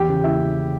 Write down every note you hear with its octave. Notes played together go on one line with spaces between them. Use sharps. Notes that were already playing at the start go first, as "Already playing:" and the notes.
Already playing: E2 E3 G4 G5
C#3
C#3 E4 E5